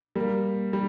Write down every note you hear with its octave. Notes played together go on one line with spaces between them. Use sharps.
G3 A#3
G3